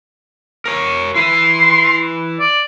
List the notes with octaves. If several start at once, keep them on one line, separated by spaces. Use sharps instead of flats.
A#4 C#5
E4 B4 C6
D5